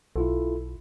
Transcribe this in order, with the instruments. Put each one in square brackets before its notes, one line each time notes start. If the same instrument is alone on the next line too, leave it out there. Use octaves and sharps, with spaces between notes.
[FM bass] B1 [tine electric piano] E4 F4 A4